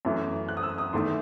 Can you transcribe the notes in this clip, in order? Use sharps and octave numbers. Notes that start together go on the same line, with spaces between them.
F#2 E3 A3 E4
F#6
D#6
E6
D#6
E2 D#3 A3 E4 C6